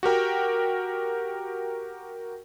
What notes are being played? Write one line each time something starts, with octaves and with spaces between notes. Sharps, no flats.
F#4 G4 A#4 G5